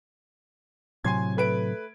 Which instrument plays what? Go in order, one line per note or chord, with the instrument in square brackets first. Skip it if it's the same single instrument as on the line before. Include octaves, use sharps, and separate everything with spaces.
[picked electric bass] A2 C3 F#3 [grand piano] G#5 C6 G#6
[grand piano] A3 B4 D7